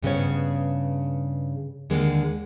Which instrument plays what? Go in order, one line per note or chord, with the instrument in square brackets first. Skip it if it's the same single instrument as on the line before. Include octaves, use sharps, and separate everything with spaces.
[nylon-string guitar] G2 C#3 B3 C#5
D#2 D3 G#3 A#3